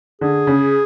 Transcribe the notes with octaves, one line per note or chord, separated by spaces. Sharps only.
D3 G#4
C#3